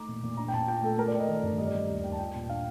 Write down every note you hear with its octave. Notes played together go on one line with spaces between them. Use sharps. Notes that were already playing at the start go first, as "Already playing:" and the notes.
Already playing: A3 D#4 A#5 D6
A#2
A#2
D4 A#5
G5
A#2 A5
F4 G5
A3 A4
A3 A#4
D5
A3
D#5
D#3
G2
G3 D#5
D5
G3 D#5
D#2
D#2 G5
A5
F4 G5
A#2
D4 F5